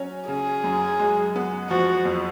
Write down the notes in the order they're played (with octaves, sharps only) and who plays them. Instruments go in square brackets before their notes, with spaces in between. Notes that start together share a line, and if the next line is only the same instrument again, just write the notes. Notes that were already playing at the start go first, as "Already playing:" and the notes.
Already playing: [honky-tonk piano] F#3 C#4
[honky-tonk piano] C#3 [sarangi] G#4
[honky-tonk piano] F#2
G#3
B3
[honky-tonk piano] F3 [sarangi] F#4
[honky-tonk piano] F2